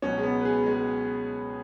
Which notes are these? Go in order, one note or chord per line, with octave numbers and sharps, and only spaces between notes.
C#2 B2 F#3 C#4
G#3
B3
B4
G#4
G#3